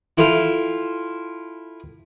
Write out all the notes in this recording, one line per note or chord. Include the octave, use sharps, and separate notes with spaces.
E4 F4 A4 F5 G5